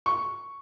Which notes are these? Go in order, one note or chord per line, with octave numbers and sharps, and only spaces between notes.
C#6